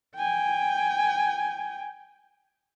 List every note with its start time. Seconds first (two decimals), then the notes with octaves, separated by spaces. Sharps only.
0.16 G5 G#5